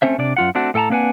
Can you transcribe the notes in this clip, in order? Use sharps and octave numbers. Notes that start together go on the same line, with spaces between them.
A3 C4 C#4 C5 E5
C3 D4 D5
F#2 F4 F#5
A3 C4 D4 F#4
A2 A4 G5 A5 A#5
A#3 C4 D4 B4 F#5 G#5